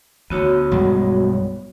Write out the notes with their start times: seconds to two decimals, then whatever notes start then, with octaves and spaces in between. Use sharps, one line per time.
0.30 D2 B3 F#4 C#5
0.72 B1 G2 G#3